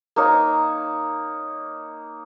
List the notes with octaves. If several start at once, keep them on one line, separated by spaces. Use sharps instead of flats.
A#3 D#4 C#5